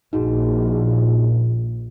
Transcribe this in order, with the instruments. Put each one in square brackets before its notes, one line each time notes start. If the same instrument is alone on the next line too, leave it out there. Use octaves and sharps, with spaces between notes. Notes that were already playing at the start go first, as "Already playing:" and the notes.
[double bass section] A#1 [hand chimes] D#4 F#4 G#4